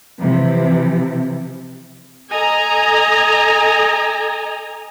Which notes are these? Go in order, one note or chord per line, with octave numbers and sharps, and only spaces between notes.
C3 E3 F3
A4 D#5 G#5 A#5